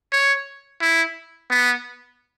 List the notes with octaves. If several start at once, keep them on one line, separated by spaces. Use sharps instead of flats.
C#5
E4
B3